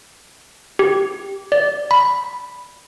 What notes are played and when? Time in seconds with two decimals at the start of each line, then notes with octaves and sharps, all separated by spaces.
0.79 G4
1.52 D5
1.91 B5